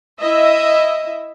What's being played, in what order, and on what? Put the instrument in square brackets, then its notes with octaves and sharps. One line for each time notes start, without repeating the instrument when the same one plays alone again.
[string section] E4 D#5 E5